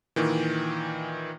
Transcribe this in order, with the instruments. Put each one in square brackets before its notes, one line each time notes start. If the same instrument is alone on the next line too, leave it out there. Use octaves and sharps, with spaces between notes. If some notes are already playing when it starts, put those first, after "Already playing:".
[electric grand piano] A#2 D#3 E3